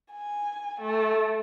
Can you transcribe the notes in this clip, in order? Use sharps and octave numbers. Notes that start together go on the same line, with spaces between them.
G#5
A3